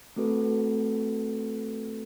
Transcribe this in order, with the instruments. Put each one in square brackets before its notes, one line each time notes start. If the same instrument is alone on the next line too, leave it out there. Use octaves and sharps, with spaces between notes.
[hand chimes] A3 C4 F#4 A4 B4